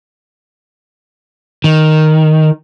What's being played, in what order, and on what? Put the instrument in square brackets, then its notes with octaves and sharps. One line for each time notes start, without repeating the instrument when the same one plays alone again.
[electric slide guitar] D#3